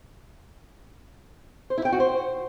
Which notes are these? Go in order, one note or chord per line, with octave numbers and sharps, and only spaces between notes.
C5
E4
G5
F#4
C5